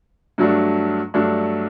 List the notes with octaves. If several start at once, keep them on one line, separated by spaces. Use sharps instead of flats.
G2 F#3 A3 D4
G2 F#3 A3 D4